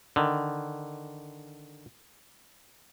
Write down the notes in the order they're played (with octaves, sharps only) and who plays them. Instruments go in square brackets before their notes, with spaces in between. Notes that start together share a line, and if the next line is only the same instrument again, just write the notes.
[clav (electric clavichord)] D3 D#3